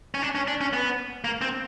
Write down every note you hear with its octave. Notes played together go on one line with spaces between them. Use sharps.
C#4
D4
C#4
D4
C#4
B3
A#3
C4